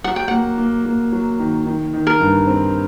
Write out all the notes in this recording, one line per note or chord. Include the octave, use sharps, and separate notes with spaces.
F#3 F#5
G5
A#3 F#5
A#3
A#3
F#3
D#3
D#3
D#3
A#4
G2
C4